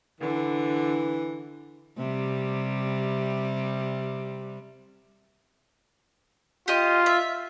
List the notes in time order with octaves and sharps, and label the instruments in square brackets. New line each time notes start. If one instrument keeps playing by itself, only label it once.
[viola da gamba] D3 [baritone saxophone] E3
[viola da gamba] C3 G3
[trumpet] F4 [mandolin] G4 D#5
[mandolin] E5